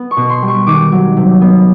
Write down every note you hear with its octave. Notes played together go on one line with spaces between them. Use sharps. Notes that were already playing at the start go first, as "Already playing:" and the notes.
Already playing: B3
C#6
B2
C6
G3
C#6
D#3 D6
F#3
C3
B3